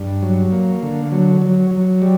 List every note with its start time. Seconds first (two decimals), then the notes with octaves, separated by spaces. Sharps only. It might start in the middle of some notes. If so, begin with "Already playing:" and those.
Already playing: G2
0.22 F#3
0.52 A#3
0.83 D3
1.12 F#3
1.42 F#3
1.71 F#3
2.02 G3